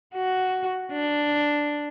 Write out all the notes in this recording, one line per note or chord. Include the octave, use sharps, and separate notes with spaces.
F#4
D4